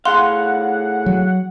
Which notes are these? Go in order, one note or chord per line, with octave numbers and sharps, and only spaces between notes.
A2 G#4 F5 F#5 C6
F#3